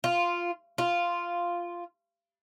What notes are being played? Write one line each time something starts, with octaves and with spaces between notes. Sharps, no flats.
F4
F4